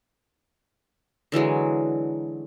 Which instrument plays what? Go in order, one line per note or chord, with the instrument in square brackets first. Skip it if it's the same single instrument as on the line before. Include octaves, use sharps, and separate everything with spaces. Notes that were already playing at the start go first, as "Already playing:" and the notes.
[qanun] D3 E3 F#3 G#3